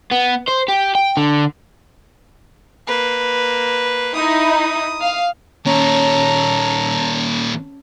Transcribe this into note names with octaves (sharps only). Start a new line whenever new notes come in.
B3
C5
G4
G5
D3
A#3 B4
D#4 E4 D#6
F5
A#2 D#3 C#4 A4 A#5